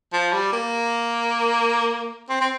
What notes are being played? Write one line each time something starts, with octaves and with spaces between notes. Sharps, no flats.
F3
G3
A#3
C4
C4